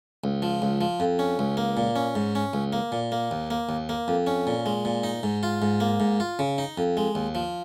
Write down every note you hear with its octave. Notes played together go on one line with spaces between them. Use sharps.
C#2
F3
C#2
F3
F2
C#4
C#2
A#3
A#2
C#4
G#2
C#4
C#2
A#3
A#2
A#3
D#2
A#3
D#2
A#3
F2
C#4
A#2
G#3
A#2
D#4
G#2
F4
G#2
A#3
G#2
F4
C#3
D#4
F2
G#3
D#2
F3